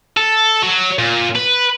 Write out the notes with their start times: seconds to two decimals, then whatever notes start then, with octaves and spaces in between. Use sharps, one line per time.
0.17 A4
0.62 F#3
0.99 A#2
1.35 B4